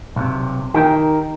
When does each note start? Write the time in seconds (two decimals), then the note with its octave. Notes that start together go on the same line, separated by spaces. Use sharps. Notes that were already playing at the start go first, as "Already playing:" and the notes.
0.16 B1 C3
0.74 D#3 G4 A#4 G5